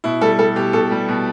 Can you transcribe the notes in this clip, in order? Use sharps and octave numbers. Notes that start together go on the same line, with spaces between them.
B2 E4
G3 A4
G3 A4
B2 G4
B2 A4
G3
B2